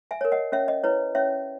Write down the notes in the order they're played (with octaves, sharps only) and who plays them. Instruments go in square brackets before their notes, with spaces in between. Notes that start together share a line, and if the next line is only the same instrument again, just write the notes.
[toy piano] E5 G#5
A#4 C#5
D#5 F#5
C#4 C#5 E5
D#5
E4 B4 C#5
C#4 C#5 E5